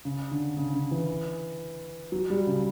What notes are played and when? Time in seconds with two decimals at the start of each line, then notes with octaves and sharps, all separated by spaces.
0.05 C#3
0.31 D3
0.57 C#3
0.74 C#3
0.91 E3
2.12 F#3
2.30 G3
2.47 C#3